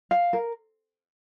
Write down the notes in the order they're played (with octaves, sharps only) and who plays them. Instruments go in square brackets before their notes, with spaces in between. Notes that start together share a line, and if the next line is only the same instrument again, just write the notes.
[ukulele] F5
A#4